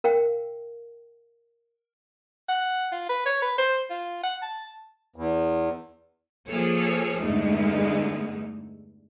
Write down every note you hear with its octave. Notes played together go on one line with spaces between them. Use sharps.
A#4 F5 G5
F#5
F4
B4
C#5
B4
C5
F4
F#5
A5
E2
F3 A#3 G#4 A4 C#5
E2 G2 D3 G#3 A3 D#4